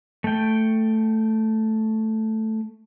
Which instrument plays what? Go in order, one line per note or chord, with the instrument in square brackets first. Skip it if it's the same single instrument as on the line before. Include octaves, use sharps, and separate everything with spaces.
[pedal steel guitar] A3 G5